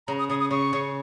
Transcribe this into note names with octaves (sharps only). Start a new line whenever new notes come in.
C#3 A#5
D#6
C#3 D#6
D#6
C#3 C#6
C#3